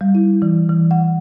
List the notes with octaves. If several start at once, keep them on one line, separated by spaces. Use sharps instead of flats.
G3
E4
E3
E3
F#5